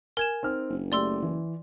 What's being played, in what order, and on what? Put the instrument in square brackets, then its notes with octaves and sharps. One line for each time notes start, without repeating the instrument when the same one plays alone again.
[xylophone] A#4 G#6 E7 [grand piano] G#5
[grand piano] C4 D#4 F6
[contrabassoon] F#1
[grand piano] A3 G4 [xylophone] D5 C6 E6
[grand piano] E3